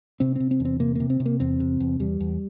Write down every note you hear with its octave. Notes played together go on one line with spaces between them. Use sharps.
C3 C4
C3 C4
C4
E2
C4
C3 A#3
C3 A#3
C4
C3
A#3
E2 C4
C3
E2
E2 G3
E2